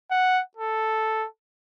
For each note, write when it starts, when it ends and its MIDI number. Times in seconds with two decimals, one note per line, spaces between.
0.11 0.41 78
0.57 1.26 69